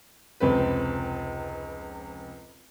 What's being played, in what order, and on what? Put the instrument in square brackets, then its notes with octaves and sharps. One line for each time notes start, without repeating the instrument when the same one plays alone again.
[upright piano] F1 C#2 C4 B4